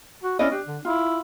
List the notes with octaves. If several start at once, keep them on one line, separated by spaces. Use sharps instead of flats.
F#4
C#4 E4 D5 D#5
D4 G4
D3
E4 F4